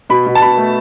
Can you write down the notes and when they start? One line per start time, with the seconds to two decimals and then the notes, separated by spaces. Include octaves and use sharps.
0.10 B2 B5
0.26 B2
0.35 A5
0.41 B2 B5
0.57 A3